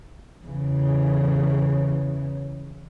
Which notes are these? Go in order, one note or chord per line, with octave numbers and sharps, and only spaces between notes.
E2 C#3 E3